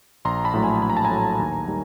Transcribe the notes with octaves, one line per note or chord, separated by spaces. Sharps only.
A#1 A#5 C6
A5 B5
A2 F#3 A3
G#5 A#5
A#1 B5
A#5
A5
G#5 A#5
A2 F#3 A3
D#2
D#3 G3